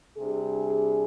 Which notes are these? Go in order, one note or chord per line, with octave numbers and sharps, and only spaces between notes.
C3 G3 D4 G#4